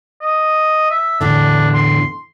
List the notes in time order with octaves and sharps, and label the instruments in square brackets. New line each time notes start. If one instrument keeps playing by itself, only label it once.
[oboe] D#5
E5
[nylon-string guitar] E2 A2 D3 [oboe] D4
[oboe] C6